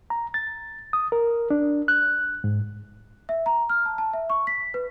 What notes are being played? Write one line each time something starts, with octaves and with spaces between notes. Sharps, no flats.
A#5
A6
D#6
A#4
D4
F#6
G#2
E5
A#5
F6
A5
A5
E5
C#6
B6
B4